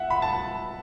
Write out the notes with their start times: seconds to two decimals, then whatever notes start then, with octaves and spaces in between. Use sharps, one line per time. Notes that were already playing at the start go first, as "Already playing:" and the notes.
Already playing: E5 F#5
0.10 B5
0.22 A5